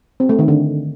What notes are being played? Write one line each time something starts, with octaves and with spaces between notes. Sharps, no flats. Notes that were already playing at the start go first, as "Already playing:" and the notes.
C4
A3
D#3
D3